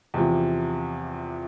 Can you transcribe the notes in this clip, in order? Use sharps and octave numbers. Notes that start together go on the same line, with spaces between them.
E2 C3 F3